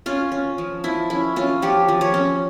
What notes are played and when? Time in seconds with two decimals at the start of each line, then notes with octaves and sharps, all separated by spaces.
0.06 C#4 F4
0.32 C#4
0.58 F3
0.84 F3 E4
1.10 C#4 E4
1.36 C#4 F4
1.62 F3 G4
1.88 F3
2.01 C#5
2.14 C#4